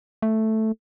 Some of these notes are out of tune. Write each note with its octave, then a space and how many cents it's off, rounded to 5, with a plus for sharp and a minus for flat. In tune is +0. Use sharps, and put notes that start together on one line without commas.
A3 +0